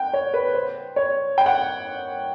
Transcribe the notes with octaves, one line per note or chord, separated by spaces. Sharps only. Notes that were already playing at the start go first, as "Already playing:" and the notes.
Already playing: F#5 G5
C#5
B4
C5
C#5
G5
F#5